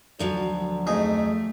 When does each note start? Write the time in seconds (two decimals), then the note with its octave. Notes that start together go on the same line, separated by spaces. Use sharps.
0.19 D2 D3 F3 F#3
0.87 F2 A3 D#4 G#4